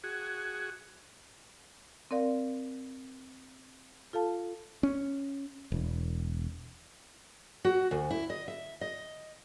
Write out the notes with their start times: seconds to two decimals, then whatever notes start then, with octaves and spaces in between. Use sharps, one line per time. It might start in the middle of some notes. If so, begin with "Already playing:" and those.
0.04 F#4 G#4
2.11 C4 A#4 D5 F5
4.13 F4 A4 F5 A5
4.83 C#4
5.72 E1
7.65 F#4
7.91 D2
8.11 E4
8.30 D#5
8.48 E5
8.81 D#5